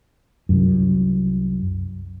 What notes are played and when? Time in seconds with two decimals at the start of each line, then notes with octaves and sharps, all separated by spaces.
0.49 C2 F#2